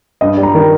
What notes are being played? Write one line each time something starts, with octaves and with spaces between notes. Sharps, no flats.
G2 D#5
G3
A#5
D#3